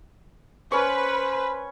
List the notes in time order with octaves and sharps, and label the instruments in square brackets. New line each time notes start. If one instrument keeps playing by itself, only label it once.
[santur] C#4 C#6 [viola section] B4 [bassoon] C5